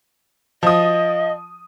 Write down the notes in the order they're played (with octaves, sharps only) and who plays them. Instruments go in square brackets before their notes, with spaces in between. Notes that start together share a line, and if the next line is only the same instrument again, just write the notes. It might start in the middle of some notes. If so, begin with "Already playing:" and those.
[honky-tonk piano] F3 D#6 [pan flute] D#5